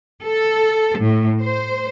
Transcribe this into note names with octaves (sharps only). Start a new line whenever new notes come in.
A4
A2
C5